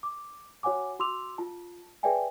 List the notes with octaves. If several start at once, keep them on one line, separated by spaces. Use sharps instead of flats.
D6
F#4 C#5 F#5 G#5 D6
F#4 C6 D6 E6 F7
F4 A5
G#4 B4 D5 E5 G5 G#5